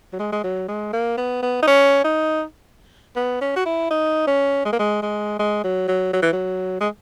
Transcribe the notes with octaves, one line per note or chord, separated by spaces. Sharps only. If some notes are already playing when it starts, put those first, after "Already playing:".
F#3
G#3
G#3
F#3
G#3
A#3
B3
B3
D#4
C#4
D#4
B3
C#4
F#4
E4
D#4
C#4
G#3
A#3
G#3
G#3
G#3
F#3
F#3
F#3
E3
F#3
G#3